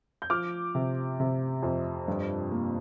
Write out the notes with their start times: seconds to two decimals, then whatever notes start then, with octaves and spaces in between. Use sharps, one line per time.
0.22 G6
0.30 F3 D6 F6
0.75 C3
1.20 C3
1.63 F2
2.08 G2
2.52 A#3